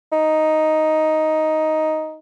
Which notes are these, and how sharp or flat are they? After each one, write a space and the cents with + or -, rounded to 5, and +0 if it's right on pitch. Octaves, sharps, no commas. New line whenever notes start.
D#4 +5